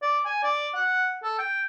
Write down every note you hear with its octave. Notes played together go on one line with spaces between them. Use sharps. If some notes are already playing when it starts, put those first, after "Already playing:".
D5
G#5
D5
F#5
A4
G5